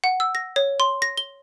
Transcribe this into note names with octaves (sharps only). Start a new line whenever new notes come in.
F#5
E6
A#6
C#5
C6
A#6
G7